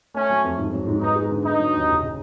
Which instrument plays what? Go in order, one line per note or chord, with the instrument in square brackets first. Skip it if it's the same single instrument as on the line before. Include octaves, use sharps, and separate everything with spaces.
[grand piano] A3 [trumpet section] C#4
[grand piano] F#3
F2
G#2
F#3
G#2
[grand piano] B3 [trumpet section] D#4
[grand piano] G#3
D3
[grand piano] B3 [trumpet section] D#4
[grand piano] F#3
D#2
F#1
C#3